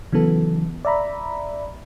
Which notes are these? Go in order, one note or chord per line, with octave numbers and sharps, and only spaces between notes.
C#3 E3 F#3 B3 A4
D5 E5 A#5 B5